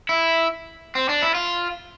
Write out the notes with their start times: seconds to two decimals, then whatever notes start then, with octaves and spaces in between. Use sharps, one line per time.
0.09 E4
0.95 C4
1.09 D4
1.22 E4
1.35 F4